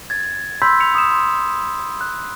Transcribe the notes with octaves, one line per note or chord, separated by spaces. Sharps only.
G#6 A6
B5 C6 E6 G6 B6
C#7 F7
D#6 E7
C6
F#6